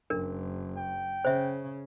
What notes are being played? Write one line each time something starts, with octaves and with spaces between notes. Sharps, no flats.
F#1 D4 A#4
G5
C#3 C5 E5